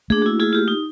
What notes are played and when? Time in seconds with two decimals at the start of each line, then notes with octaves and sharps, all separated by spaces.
0.10 A3 A#3 D4 G#4
0.22 E4 F#4
0.40 E4 F4 G#4
0.53 F4 G4
0.68 D#4